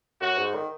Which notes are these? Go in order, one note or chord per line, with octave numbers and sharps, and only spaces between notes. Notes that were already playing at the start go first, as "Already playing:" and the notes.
F#2 F#4
G#2
D#3